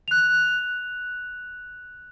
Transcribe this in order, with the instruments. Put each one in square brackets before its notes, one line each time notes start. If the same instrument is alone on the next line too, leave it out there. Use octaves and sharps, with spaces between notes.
[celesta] F#6 F7